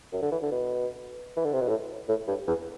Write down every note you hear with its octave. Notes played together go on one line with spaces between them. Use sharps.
F#2
D3
E3
D3
B2
E3
D3
C3
B2
A2
A2
G2
E2